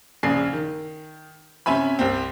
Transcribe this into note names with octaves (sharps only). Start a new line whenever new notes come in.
A#1 C#3 G#5 C7
D#3
C3 C#4 E5 G#5 B5
C2 C4